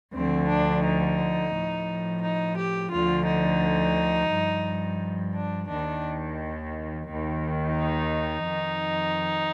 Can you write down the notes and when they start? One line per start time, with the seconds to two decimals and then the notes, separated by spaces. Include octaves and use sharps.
0.13 D2 D3 F3 C4
0.48 D4
0.84 D#4
1.52 A2 F3
2.21 D#4
2.56 G4
2.91 D2 D3 F3 F4
3.26 D#4
4.30 G2 F3
5.34 D4
5.68 D#2 D#3 D4
7.06 D#2 D#3
7.76 D#4
8.45 F2 D#3